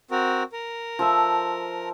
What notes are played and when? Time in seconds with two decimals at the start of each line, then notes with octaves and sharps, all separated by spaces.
0.11 C4 F#4 A#4
0.52 A#4
0.99 F3 A4 E5